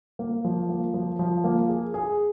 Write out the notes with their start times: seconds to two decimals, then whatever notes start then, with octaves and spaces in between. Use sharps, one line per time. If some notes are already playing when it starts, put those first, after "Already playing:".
0.19 A#3
0.44 F3
0.69 A#3
0.94 F3
1.19 F3
1.44 A#3
1.69 G#4
1.94 G#4